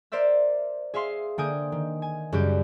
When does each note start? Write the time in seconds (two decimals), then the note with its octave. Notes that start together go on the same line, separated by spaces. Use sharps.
0.12 A#4 C5 D5 E5 E6
0.94 G#4 E5 F5 C6 C7
1.38 D3 A#3 G5 G#5 D#6 G6
1.72 D#3
2.02 G#5
2.32 F#2 C#3 G3 G4 G6